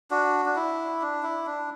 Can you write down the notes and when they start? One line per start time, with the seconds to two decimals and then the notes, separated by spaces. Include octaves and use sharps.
0.11 D4 F#4
0.46 D4
0.55 E4
1.01 D4
1.23 E4
1.46 D4